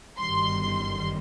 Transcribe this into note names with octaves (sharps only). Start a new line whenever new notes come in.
G1 F#2 D#3 G3 C6